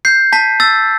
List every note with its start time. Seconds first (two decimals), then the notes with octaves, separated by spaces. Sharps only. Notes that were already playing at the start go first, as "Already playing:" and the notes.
0.05 G6 C7
0.33 A5 B6
0.60 E6 A6